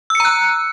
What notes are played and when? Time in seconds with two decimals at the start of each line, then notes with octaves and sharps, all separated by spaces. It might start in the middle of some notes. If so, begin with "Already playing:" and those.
0.10 E6
0.15 C#7
0.20 A#5
0.25 F#6